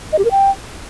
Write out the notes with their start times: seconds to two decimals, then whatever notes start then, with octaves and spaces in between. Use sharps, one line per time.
0.12 D#5
0.19 G4
0.25 A#4
0.31 G5